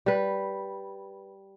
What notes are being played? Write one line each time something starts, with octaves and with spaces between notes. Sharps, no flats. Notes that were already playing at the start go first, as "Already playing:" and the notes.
G3 B4